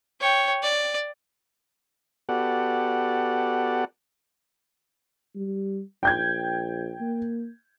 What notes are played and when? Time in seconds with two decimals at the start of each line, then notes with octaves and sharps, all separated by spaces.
0.21 C#5 G5
0.62 D5
2.29 B3 F#4 G4 A4 D5 F#5
5.36 G3
6.03 A#1 G5 G6 G#6
7.01 A#3